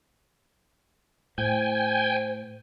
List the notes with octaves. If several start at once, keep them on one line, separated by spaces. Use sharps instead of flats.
A2 C5 G5 G#5